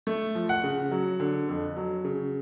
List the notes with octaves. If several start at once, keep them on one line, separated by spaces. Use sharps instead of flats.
A3
F3
F#5
C#3
F#3
D3
F2
F#3
C#3